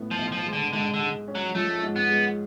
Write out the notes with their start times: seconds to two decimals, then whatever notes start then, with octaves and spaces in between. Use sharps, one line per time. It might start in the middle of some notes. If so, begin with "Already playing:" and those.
Already playing: A2 B3
0.11 F3
0.18 B1
0.32 F3
0.46 G#3
0.53 D3
0.73 G#2 D3
0.94 D3
1.00 G#3
1.28 C#4
1.35 F#3
1.55 F3 A3
1.83 G#2
1.96 B3
2.09 G#3